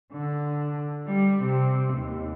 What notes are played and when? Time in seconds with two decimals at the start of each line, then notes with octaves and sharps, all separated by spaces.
0.12 D3
1.06 G3
1.43 C3
1.94 D#2